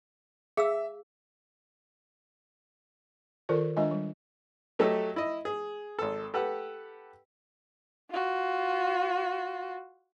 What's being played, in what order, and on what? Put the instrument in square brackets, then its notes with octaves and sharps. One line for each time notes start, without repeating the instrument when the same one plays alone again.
[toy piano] G#4 F5 E6 [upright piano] E5
[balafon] D#3 F4 A4 A#4 D5
D#3 G#3 D4 F4 D#5 G#5
G3
[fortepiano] F#3 A3 G4 A4 D#5
E4 D#5
G#4
G#1 A4
G4 A4 B4 F#5
[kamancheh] F4 F#4